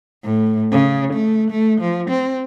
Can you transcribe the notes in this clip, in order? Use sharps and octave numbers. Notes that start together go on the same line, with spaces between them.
A2
C#3
A3
A3
F3
C4